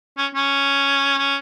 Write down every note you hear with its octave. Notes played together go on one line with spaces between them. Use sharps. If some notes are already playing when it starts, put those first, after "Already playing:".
C#4
C#4
C#4